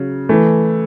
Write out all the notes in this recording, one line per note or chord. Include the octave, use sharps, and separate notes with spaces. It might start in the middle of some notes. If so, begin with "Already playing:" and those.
Already playing: C#3 F#3
E3 A3